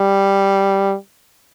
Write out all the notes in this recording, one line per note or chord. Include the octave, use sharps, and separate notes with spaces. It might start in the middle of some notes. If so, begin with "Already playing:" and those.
Already playing: G3